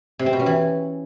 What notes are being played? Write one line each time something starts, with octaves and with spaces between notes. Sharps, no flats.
C3
C4
B2
C#4
E3